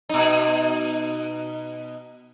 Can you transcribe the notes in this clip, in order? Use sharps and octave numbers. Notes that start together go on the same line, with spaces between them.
B2 D#4